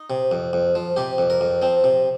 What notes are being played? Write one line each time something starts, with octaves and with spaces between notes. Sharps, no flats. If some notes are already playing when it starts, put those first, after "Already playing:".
Already playing: D#4
C3
F2
F2
F3
C3 G4
F2
A#4
F2
F3 C4
C3